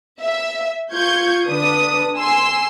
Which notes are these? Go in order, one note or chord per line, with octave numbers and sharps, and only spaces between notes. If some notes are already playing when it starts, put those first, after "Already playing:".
E5
F4 C#6 G6 G#6
D3 D4 B4 D#6
G#5 C6 E6 C7